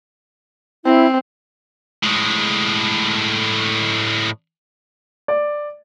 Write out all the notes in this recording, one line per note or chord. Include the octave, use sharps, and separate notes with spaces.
C4 E4
A2 G#3
D5